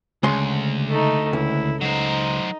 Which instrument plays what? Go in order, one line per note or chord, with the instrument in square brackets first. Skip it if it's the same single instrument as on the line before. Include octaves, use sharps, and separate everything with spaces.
[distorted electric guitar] D2 [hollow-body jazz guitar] C#3 G#3 C6
[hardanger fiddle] A3 D#4
[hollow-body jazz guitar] C#2 [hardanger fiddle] E4
[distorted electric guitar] F#3 C5 [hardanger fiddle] D#4